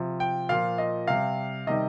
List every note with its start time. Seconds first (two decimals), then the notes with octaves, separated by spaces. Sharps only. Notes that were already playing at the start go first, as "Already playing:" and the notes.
Already playing: C3 F3
0.20 G5
0.49 A#2 F3 F5
0.78 D#5
1.08 C3 G3 F5
1.67 C3 D#3 G3 D#5